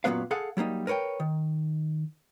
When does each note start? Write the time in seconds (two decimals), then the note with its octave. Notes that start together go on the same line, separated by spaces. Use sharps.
0.04 F#2 A#2 F#3 B3 B4 F5
0.31 G#4 A4 F5 F#5
0.57 F#3 G3 A#3 D#4
0.87 A#4 B4 C#5 D#5 G5
1.20 D#3